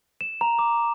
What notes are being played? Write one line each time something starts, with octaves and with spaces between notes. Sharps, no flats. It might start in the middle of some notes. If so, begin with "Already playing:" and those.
E7
A#5
D6